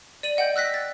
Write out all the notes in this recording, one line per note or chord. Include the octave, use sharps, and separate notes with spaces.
D5 D#7 F#7
D#5 F#5 G5 G6
E6 F#6 A#6 B6
A6